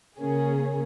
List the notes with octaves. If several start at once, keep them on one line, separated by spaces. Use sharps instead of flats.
C#3 A#3 C#4 G#4